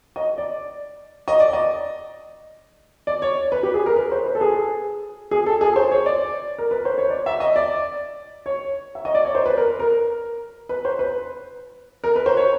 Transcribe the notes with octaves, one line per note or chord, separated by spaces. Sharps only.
D#5
D5
D#5
D5
D#5
D5
C#5
B4
G4
G#4
A#4
B4
C5
B4
A4
G#4
G#4
A4
G#4
C5
C#5
D5
A#4
B4
C5
C#5
D5
E5
D#5
D5
C#5
E5
D#5
D5
C#5
C5
B4
A#4
A#4
B4
C5
B4
A#4
B4
C5
C#5